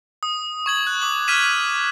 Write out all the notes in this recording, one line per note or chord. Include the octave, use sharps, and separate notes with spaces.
D#6
C#6 G#6 F#7
F#6
D6 F#7
F6 G#6 B6 D#7 E7